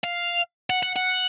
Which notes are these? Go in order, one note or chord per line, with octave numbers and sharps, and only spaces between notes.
F5
F#5
F#5
F#5